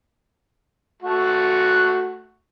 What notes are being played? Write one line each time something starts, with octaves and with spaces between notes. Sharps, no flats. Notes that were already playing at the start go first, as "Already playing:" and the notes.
A3 F#4